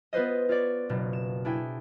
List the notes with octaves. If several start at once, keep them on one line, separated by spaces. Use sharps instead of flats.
B3 F4 B4 C5 D#5
F4 C#5 D5
F#1 B2
E7
D4 E4 G#4 G5